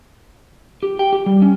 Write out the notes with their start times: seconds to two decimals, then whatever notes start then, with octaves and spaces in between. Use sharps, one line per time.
0.83 G4
0.99 G5
1.13 G4
1.26 G3
1.42 C#4